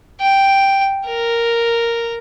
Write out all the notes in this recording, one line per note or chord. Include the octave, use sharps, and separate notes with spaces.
G5
A#4